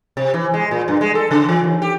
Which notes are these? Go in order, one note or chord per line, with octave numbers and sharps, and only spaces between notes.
C3
E3
G#3
A#2
G2
G#3
A4
C#3
E3
D#2
G4